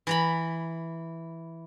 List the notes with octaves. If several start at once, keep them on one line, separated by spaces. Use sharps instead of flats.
E3 A#5 B5